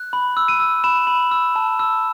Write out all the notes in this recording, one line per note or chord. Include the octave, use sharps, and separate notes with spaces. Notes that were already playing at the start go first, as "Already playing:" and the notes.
Already playing: F#6
B5
E6
D#7
E6
B5 E7
B5
E6
A5
E6